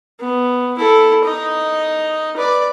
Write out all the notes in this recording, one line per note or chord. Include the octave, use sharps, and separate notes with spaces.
B3
E4 A4
D#4 D#5
B4 D5